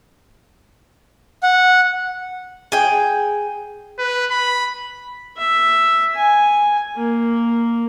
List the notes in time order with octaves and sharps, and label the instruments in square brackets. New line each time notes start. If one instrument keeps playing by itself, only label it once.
[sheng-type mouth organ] F#5
[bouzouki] G#4 G5
[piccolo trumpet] B4
B5
[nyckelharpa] E5
G#5
A#3